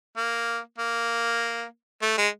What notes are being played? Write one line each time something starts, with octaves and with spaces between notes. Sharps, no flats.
A#3
A#3
A3
G#3